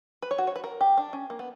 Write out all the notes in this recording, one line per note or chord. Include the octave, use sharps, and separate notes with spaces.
B4
C#5
F#4
C#5
B4
A#4
G4
D4
C#4
A#3
B3